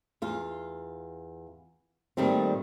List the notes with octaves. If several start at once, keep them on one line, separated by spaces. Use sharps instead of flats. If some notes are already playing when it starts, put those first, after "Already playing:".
E2 F4
A#2 D#3 G3 A3 C4